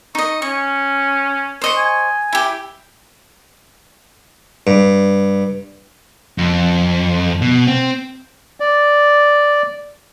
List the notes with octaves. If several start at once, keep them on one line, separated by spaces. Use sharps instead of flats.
D#4 D#5 C#6
C#4 C#6
C5 D#5 C#6
G#5
E4 G4
G2
F2
B2
C4
D5